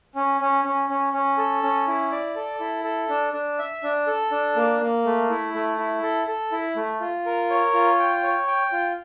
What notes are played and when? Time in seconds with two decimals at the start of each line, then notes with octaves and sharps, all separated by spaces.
0.15 C#4
0.41 C#4
0.64 C#4
0.90 C#4
1.13 C#4
1.38 A4
1.63 C#4
1.88 E4
2.12 D5
2.36 A4
2.60 E4
2.84 A4
3.09 D4
3.33 D4
3.59 E5
3.83 D4
4.07 A4
4.31 D4
4.56 A#3
4.81 A#3
5.05 A3
5.30 E4
5.54 A3
5.79 E4
6.03 A4
6.28 A4
6.52 E4
6.76 A3
7.00 F4
7.26 A#4
7.50 C#5
7.74 F4
7.99 G5
8.23 C#5
8.47 G5
8.72 F4